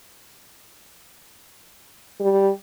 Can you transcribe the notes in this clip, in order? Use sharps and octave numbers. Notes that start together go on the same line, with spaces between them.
G3